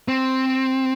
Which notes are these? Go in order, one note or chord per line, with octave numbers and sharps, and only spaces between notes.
C4